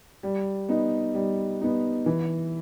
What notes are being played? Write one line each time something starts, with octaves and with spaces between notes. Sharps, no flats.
G3
B3 D#4
G3
B3 D#4
E3